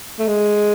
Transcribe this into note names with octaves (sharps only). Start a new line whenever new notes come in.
A3
G#3